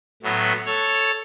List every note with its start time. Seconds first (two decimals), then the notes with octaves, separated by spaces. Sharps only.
0.23 A2 F#3 B3
0.66 A4 C#5